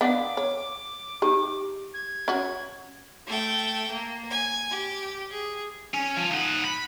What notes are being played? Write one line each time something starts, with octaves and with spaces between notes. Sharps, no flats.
B3 D4 F5 F#5 D6
C#5
D#4 G4
G#6
C#4 F#4
A3 G5
A#3
G#5
G4
G#4
C#4
F3
D#4 F#5
B5